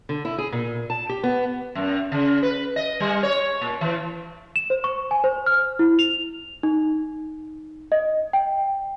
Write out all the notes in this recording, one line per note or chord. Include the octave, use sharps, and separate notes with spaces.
D3
E4
G#4
A#2
A5
G4
B3
F#2
C#3
B4
D#5
G3
C#5
A#2
E3
E7
C5
C#6
G#5
C5
F6
E4
F7
D#4
D#5
G5